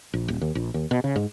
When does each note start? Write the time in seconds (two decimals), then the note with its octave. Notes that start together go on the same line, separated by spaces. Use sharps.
0.14 A#1
0.28 D#1
0.41 D#2
0.55 A#1
0.74 D#2
0.91 B2
1.04 C#3
1.16 G#2